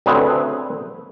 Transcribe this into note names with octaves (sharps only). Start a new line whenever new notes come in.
D2 C#3 C4 G#4 B4